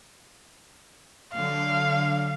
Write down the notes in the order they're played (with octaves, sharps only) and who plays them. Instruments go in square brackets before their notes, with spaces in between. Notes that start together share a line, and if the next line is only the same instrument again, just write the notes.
[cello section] D3 F#3 [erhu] F5